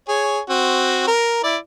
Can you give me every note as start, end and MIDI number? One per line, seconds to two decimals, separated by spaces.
0.09 0.40 68
0.09 0.40 73
0.49 1.06 60
0.49 1.06 66
1.07 1.40 70
1.44 1.57 64
1.44 1.57 74